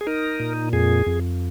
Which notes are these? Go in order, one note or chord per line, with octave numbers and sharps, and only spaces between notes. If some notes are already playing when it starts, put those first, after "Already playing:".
G#4
D#4 A#4
A#2
F2 G#4
F2